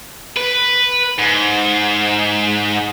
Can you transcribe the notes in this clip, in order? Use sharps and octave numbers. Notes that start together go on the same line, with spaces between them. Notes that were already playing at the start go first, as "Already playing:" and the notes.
B4
G#2